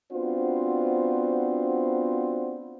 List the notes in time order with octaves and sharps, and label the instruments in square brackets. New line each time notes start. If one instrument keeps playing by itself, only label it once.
[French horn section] B3 C4 D4 F4 F#4 C5